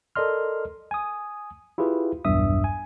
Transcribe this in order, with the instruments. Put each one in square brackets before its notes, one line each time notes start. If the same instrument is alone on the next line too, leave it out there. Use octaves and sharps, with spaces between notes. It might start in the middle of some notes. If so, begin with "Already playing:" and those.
[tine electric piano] A4 A#4 D5 D#5 C6 F6
G#5 D#6
E4 F4 G4 G#4 B4
B1 E2 G2 E5 D#6
G#5